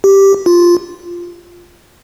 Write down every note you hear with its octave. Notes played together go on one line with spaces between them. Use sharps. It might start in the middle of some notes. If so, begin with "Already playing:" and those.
G4
F4